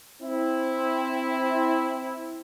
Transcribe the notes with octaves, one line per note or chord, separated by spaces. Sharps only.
C4 E4